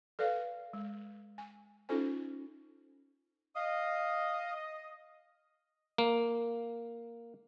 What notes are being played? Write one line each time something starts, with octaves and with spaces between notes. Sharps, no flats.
A4 B4 D5 F5
G#3
G#5
C#4 D#4 F4 A4 C5 G#5
D#5 F5
A#3